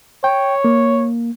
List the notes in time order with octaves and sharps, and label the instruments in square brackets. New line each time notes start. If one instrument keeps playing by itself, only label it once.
[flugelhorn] C#5 [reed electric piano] G5
[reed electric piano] A#3